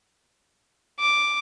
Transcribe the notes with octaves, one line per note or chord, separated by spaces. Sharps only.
D6